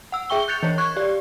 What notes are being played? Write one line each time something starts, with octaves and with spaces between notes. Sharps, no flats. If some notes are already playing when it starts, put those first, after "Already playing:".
F#5 E6
G#4 E5 G5 C#6 G7
F#6 G6 A6 C#7 F7
E3 C#5
C#6 F#6 G#6
G4 D5